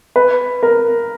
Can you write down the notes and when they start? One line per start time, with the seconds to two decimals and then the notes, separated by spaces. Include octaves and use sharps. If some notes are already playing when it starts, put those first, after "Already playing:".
0.16 B4
0.63 A#4